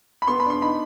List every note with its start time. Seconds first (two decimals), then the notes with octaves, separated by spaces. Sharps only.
0.22 B5
0.27 B3 C6
0.40 B5
0.46 D4 C6
0.62 D#4 B5